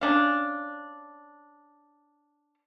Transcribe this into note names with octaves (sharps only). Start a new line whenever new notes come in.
C#4 D4 F5